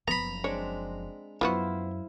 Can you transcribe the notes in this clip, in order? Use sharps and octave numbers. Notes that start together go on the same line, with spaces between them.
F#1 F3 B3 A#5 B5
G#3 C4 D4 C#5
F#2 F3 B3 E4 F#4 C5 F5